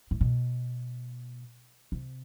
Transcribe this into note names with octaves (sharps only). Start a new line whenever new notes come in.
A2
B2
C3